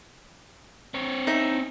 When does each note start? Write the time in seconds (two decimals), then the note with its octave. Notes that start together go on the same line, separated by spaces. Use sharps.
0.94 C4 C#5
1.27 D#4 E5